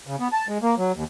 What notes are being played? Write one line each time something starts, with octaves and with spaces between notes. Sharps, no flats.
C#3
B3
A5
G#3
A#3
F#3
D#2